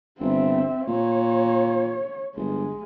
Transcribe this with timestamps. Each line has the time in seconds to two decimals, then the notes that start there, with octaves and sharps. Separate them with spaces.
0.20 G1 C4 E5
0.87 A#2 C#5
2.36 G1 G#3